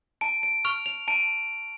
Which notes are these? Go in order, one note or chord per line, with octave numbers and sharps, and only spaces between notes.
A5 D7
D7
C#6 F6 F7
F7
A5 D7